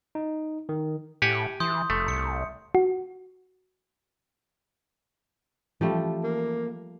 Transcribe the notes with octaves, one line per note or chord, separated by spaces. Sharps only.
D#4
D#3
A2 G4 F#5 G#5
E3 C6 D#6 G6
F1 A3
C2 C#7
F#4
E3 F3 G3 A3 C#4
A#3